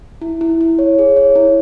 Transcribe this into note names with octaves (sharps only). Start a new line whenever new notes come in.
E4
E4
E4
C#5
G#4
C#5
E4